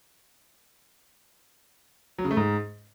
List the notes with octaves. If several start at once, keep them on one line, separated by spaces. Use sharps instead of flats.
F#3
C#3
A3
G#2